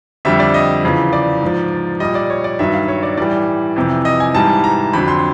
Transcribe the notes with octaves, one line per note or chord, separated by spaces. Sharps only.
F2 D3 G3 E5
D5
D#5
E2 C#3 F3
D5
G#2 F3
A#2 G3 D#5
D5
C#5
D5
G2 D#3 F#3 E5
F5
C#5
D5
A2 E3 G3 D5
F2 C3 E3
D#5
G#5
G#2 E3 G3 A5
A#5
F2 D3 F#3 B5
C6